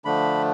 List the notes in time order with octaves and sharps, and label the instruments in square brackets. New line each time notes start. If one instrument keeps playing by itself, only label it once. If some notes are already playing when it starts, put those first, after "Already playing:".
[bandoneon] D3 F3 A3 D4 B5